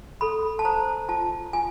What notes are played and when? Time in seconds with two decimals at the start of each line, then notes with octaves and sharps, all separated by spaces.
0.21 A4 B5
0.59 A5
0.65 C5 A#5
1.09 F4 A5
1.53 F4 G#5